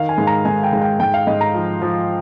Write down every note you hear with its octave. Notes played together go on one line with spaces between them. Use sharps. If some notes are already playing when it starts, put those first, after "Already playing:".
Already playing: D#3 F5
G#5
G#2
A#5
G#2 G#5
G5
G#2
G5
G#2 G5
F5
G#2 D#5
A#5
F3
F3